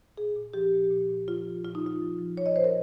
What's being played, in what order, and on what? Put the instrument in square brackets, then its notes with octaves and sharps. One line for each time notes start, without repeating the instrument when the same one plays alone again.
[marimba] A#2 G#4
A#2
F3 G4
A#2
A#2
A#2
F3 F4
F3
A#2 F4
D#4
A#2 F4
F3
F3
A#2 C#5
D#5
A#2 C5
A#4